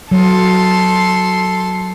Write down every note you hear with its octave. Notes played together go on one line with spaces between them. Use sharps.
F#3 A4 C6